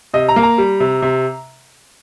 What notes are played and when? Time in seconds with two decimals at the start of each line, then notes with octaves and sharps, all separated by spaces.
0.14 C3 D#5
0.29 A#5
0.36 A#3
0.43 A#5
0.58 G3
0.80 C3
1.02 C3